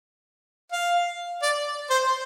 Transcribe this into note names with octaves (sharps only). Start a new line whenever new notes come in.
F5
D5
C5